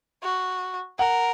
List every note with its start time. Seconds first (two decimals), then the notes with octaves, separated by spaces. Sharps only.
0.23 F#4
0.99 A#4 F#5